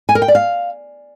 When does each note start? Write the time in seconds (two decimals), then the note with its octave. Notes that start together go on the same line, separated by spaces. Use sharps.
0.09 G#5
0.15 A#4
0.22 G5
0.28 D5
0.35 F5